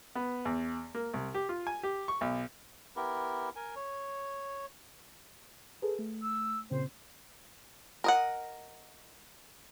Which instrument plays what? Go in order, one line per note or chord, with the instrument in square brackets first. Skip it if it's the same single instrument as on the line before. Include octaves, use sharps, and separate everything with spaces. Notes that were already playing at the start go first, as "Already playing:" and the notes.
[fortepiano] B3
E2
A#3
C2
G4
F4
G#5
G4
C#6
B1
[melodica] B3 E4 G4 A#4
A#4 G#5
C#5
[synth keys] G#4 A4 B4
A3
[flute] E6
[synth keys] A#2 C#3 C4 [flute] C5
[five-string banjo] A#4 D#5 F#5